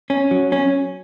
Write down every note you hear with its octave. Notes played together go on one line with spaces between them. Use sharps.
C#4
F#3
C#4